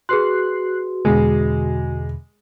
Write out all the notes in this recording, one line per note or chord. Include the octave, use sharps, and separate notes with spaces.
F#4 G#4 B4 C6 F#6 C7
E2 B2 D3 G#3